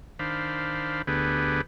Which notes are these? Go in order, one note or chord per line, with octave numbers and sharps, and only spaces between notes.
D#3 D4 C5 F5 B5
D2 D3 B3 G4 G#4 B4